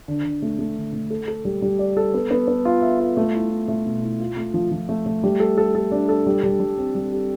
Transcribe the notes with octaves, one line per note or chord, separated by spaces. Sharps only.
D3
D3
A3
A3
D3
A3
A4
A4
G3
G3
D5
A4
B3
B3
B3
F4
E5
F4
A3
E4
E4
A3
B2
E4
F4
A3
F3
F3
A3
A3
G3
A4
A4
A4
D4
A4
G3
G3
G3
C4
G3
G4